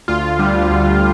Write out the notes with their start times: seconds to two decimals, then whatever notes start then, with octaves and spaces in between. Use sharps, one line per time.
0.08 D2 F4
0.39 D3 G3
0.70 D2